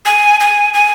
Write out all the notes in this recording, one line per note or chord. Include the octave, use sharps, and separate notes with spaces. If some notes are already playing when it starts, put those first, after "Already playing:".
G#5
G#5
G#5